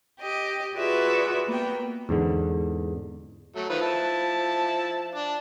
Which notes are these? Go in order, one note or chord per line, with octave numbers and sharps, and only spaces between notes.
G4 D#5
F4 F#4 G#4 B4 D5 E5
A#3 B3 G5
E2 G#2 D3
F#3 A3
D#3 F3 B4
E4 A5
D4